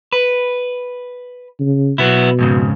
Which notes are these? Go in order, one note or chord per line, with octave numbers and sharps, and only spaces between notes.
B4
C#3
B2 F#3 B3 E4
F2 G#2 C#3